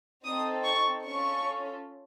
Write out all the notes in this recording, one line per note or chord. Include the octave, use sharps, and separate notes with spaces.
C4 D#4 A4 D#6
C#6
C#4 F4 A4 C#6